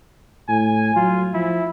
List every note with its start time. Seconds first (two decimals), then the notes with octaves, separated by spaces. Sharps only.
0.49 A2 G#5
0.96 F#3 F4
1.34 F3 E4